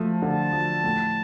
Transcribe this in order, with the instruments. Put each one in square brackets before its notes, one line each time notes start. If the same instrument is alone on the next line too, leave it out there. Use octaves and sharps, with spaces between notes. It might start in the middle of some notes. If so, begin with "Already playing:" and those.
Already playing: [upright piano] F3 A3
[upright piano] D3 [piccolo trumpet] A5
[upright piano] F3
A2